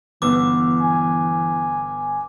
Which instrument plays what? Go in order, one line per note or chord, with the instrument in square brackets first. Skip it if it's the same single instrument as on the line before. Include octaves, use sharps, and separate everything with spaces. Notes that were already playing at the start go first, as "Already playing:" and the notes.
[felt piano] G1 B3 E6 [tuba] E3 [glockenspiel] D6
[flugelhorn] G#5